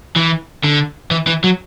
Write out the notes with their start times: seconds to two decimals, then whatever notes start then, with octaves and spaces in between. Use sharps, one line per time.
0.16 E3
0.64 D3
1.11 E3
1.27 E3
1.44 F#3